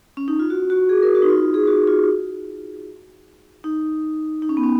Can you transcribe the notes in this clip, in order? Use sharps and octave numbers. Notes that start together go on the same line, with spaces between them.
C#4
D#4
F4
F#4
F#4
G#4
A#4
F#4
D#4
F4
G#4
F#4
F4
D#4
D#4
C#4
B3
C#4